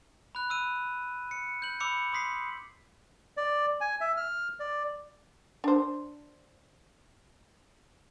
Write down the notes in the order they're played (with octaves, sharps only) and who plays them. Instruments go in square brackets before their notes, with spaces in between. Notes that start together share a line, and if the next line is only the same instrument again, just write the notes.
[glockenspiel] B5 F#6
B5 E6 D#7
C#7
G6 F#7
B5 D6 E6 C#7
C6 D#6 B6 C7
[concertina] D5
G#5
E5
F6
D5
[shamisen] D4 C5